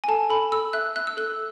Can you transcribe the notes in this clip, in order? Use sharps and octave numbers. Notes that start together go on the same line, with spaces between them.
G#5
A4 A5
A4 B5
A4 E6
E5 F#6
E5 F#6
E6
A4 F#6